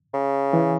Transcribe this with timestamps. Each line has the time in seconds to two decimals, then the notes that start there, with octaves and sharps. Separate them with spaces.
0.13 C#3
0.53 E3